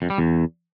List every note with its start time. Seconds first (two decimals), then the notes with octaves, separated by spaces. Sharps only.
0.02 F2
0.10 G3
0.18 E2